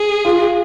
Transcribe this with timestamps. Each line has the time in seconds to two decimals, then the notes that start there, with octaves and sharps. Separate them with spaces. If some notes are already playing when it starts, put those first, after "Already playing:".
Already playing: G#4
0.25 F4